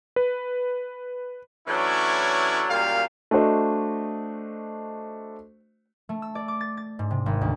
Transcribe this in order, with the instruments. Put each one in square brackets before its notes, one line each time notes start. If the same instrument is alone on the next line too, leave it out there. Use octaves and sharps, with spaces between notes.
[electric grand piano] B4
[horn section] E3 F#3 A3 C#4 D4 E4
F#2 A#2 G3 F5
[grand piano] A3 D4 F#4 C5 D#5
[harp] A3
E6
D5
D6
A6
A6
G#2
C3
G#1
D2